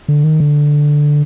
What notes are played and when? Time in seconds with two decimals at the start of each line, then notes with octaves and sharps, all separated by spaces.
0.08 D3
0.24 D#3
0.40 D3